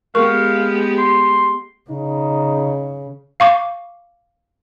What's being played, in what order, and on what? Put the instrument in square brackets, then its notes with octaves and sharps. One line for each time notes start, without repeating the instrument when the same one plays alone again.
[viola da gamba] G#3 B3 G4 [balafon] A#4 C#6 [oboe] F5
[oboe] C6
[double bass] C#3 [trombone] D#4
[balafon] F5 C#6 D6